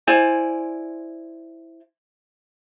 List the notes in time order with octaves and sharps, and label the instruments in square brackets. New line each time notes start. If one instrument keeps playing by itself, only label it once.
[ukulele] E4 C5 D5 G#5